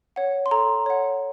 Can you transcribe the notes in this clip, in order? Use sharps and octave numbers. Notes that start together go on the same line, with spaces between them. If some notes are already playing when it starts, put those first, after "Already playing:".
C#5 F#5
C6
A4 A#5
C#5 F#5